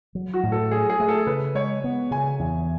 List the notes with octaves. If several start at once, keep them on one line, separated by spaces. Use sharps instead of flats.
F#3
F#4
A2
A4
F#3 G#4
G#4
A3
A4
C#3 B4
G#3 C#5
B3
C#3 G#5
E2